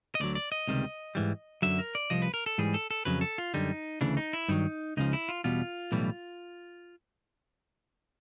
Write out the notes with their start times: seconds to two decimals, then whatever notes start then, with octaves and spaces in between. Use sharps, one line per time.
0.15 D#5
0.20 D2 D3 F#3 D5
0.35 D5
0.52 D#5
0.67 C#2 C3 D#3 G3
1.15 G#2 E3 G3
1.62 F#2 D3 F#3 E5
1.79 A#4
1.95 D5
2.10 C2 C3 F3 D#5
2.22 B4
2.34 A#4
2.46 A4
2.58 G#2 E3 G3 G#4
2.74 A4
2.91 A4
3.05 F2 C#3 F#3 B4
3.21 A4
3.38 F4
3.54 F#2 D3 G3 D#4
4.01 D2 C#3 E3 D4
4.17 D#4
4.33 E4
4.48 G2 D#3 F#3 D#4
4.97 C#2 C#3 F3 D#4
5.13 E4
5.29 F4
5.44 E2 B2 G3 F4
5.92 B1 A2 E3 G3